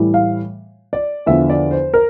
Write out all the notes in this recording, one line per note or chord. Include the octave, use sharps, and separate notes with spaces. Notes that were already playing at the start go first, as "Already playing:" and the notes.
Already playing: A2 E3 G3
F5
D5
E2 D3 F3 E5
D5
C5
A#4